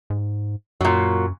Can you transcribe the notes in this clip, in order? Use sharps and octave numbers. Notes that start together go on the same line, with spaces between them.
G#2
F#2 A#2 F#3